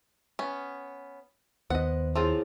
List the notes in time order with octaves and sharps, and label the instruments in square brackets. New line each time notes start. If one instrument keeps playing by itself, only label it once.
[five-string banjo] B3 C#4
[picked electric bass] D#2 B3 [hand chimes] C5 [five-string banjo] D#5 F#5
[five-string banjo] F3 C4 F4 [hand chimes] E4 G#4 C#5